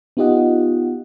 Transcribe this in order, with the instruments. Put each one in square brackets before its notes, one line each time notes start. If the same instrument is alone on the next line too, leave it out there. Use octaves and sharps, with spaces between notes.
[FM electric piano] B3 D#4 F4 G4 D#5 F#5